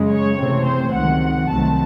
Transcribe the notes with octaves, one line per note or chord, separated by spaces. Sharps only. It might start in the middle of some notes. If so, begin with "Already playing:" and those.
Already playing: F#2 C#3 G#3
C#5
C3 E3 A3 C4
C5
C#2 C3 D#3 F#3 F#5
C2 C3 D#3 F#3 A3 A5